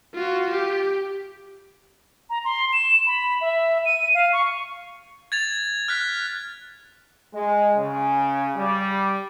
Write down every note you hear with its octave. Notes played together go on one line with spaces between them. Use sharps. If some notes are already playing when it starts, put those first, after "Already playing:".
F4 F#4
G4
A#5
C6
E7
B5
E5
D#7
F5
C#6
G#6 A6 F7
F6 F#6 B6
G#3
C#3
G3